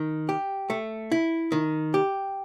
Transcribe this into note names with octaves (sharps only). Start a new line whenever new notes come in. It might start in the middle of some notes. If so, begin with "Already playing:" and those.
Already playing: D#3
G4
A3
E4
D#3
G4